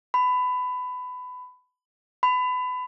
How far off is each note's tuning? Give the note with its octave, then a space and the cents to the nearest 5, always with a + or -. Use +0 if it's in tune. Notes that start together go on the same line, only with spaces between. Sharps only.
B5 +20
B5 +25